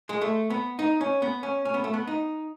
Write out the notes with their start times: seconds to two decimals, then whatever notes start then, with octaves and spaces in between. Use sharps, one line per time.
0.09 G#3
0.21 A3
0.50 B3
0.79 D#4
1.01 C#4
1.22 B3
1.43 C#4
1.65 C#4
1.74 B3
1.84 A3
1.94 B3
2.07 D#4